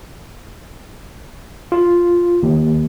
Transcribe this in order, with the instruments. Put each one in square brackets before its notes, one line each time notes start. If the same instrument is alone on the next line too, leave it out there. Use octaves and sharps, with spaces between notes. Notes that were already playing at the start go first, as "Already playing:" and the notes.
[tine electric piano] F4
D#2